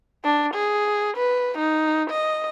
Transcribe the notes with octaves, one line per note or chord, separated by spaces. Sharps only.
D4
G#4
B4
D#4
D#5